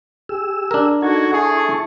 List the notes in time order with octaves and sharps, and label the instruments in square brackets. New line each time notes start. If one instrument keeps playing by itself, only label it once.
[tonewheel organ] G4 G#4 E6
[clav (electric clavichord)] D4 A#4
[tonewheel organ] D#4 G#6 [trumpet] F#4 [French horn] A4
[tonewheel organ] E4 A5 C#6 [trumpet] G#4